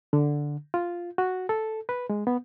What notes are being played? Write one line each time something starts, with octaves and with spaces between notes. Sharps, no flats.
D3
F4
F#4
A4
B4
G#3
B3